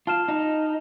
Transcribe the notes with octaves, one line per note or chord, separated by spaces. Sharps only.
F4 A5 F6 E7
D#4